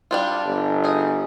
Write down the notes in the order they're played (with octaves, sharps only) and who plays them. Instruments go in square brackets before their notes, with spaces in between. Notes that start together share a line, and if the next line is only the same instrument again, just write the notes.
[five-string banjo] G3 D4 F4
[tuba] G1
[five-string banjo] D#4 G#4